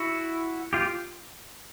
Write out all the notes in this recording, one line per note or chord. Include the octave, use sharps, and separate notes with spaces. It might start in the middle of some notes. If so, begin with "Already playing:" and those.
Already playing: E4 F#4
F4 G4